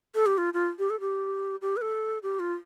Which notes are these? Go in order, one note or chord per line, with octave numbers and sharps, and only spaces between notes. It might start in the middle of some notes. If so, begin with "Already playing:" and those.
A4
G4
F4
F4
G4
A4
G4
G4
B4
A4
G4
F4